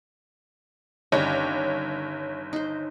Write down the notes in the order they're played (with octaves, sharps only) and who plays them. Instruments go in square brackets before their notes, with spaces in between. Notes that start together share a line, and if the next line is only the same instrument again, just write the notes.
[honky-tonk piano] G1 C#5 [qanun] D#3 G3 C#4
[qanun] D#4 C5